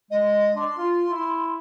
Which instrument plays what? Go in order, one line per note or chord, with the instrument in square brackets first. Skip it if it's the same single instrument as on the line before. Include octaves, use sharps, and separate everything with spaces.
[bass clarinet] G#3 [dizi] D#5
[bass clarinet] D4 [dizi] C6
[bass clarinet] F4
E4